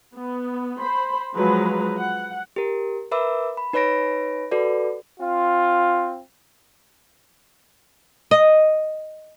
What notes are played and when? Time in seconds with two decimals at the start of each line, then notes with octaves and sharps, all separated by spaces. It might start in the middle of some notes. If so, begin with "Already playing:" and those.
0.14 B3
0.78 C5 B5
1.36 F3 F#3 G#3 B4 A#5
1.97 F#5
2.56 G4 A#4
3.12 A#4 B4 E5 B5 D6 E6
3.57 B5
3.73 D#4 B4 C#5 B5 A#6 D7
4.51 F#4 A4 B4 D5
5.20 C4 F4
8.31 D#5